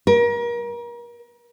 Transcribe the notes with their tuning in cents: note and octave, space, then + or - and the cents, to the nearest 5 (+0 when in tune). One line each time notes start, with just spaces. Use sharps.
A#4 +35